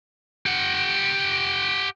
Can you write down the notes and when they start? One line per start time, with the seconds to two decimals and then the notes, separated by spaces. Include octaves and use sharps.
0.46 G4 F#5